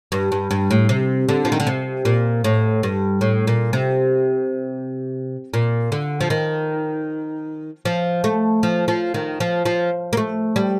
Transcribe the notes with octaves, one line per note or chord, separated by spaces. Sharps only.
G2
G2
G2
A2
C3
D3
F3
D#3
D3
C3
A#2
A2
G2
A2
A#2
C3
A#2
D3
F3
D#3
F3
A3
F3
F3
D#3
F3
F3
A#3
A3
G3